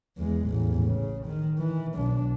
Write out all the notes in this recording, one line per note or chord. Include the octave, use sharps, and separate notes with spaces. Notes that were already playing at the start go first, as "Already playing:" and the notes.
E2 G#3
A1 E2
C#3
D#3
E3
B1 D4